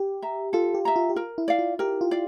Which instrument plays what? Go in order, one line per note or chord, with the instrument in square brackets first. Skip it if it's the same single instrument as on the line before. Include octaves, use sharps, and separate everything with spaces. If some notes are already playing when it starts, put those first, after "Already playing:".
Already playing: [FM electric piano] G4
[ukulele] E5 A#5
[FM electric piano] F4 [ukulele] A4
[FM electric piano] G4
[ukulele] E5 A#5
[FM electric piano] F4
G4
[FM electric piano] F4 [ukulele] A#4
[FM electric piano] E4
[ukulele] D5 F5
[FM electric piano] F4
[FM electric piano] G4 [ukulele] A#4
[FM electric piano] F4
[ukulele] D5 F5